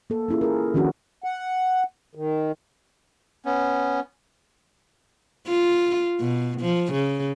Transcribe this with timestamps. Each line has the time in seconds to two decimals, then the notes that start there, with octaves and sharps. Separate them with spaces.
0.10 A#3 A4
0.28 A#3 C#4 E4 F4 G#4
0.41 G#4 A#4
0.74 D#3 F3 C#4 D4 F#4
1.24 F#5
2.15 D#3
3.45 B3 C#4
5.47 F4
6.20 B2
6.61 F3
6.93 C#3